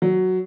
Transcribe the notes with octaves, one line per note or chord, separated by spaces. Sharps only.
F#3